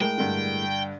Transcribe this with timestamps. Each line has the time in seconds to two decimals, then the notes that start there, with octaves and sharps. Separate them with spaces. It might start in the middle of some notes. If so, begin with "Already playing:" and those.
0.01 A2 G#3 A#4 G5
0.18 G2 D3